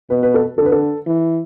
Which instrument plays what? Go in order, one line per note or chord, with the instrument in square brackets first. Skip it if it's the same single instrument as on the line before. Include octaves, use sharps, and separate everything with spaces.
[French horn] B2 [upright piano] B4
[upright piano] B4
A4
[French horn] D3 [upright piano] A4
[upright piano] B4
A4
[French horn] E3